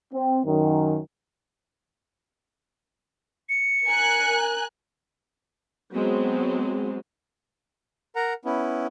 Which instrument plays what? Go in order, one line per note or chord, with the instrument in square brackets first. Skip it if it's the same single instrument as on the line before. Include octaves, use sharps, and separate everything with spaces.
[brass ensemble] C4
F#2 D#3
[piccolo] C#7
[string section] A#4 G#5 F#6
[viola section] F#3 G#3 B3 C4
[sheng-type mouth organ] A#4 F#5 A#5
B3 C#4 E4